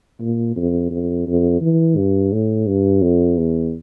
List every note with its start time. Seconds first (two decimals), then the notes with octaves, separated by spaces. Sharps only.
0.21 A#2
0.56 F2
0.91 F2
1.27 F2
1.61 E3
1.97 G2
2.33 A2
2.67 G2
3.02 F2
3.38 E2